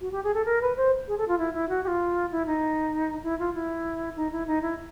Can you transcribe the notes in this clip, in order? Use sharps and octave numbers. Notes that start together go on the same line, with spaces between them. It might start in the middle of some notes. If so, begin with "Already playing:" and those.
F#4
G4
G#4
A4
A#4
B4
C5
G#4
A4
F4
E4
E4
F#4
G4
F4
E4
D#4
E4
F4
E4
D#4
E4
D#4
E4